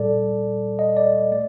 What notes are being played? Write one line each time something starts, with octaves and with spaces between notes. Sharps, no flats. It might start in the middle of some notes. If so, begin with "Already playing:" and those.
Already playing: A#2 G3 A4 D5
D#5
D5
A3 D5